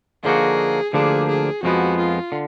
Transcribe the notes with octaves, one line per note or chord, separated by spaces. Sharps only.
D3 F3 A#3 D#4 F#4 G#4
D2 D3 F3 A#3 D4 G#4
G#4
F2 F3 G#3 B3 F#4
F4
D3